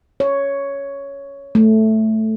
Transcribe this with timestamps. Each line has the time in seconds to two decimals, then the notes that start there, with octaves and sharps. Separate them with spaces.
0.20 C#5
1.55 A3